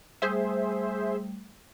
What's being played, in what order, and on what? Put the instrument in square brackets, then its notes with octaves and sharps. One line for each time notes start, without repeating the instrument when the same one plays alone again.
[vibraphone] G3 A3 [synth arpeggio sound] G#4 C5 E5